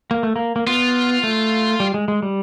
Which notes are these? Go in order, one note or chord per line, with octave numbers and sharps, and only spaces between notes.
A#3
A3
A#3
A#3
B3 F4
A3
G3
G#3
G#3
G3